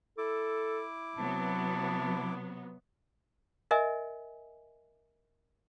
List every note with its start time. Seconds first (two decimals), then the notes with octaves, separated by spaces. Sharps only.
0.18 E4 A4 D6
1.17 C3 F#3 B3 A5
3.71 A#4 D#5 E5 G#5